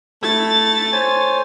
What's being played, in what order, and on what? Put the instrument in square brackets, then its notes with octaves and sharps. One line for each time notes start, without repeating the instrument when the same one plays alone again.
[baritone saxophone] A3 [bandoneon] E4 [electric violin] A6
[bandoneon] C5 C#5 G#5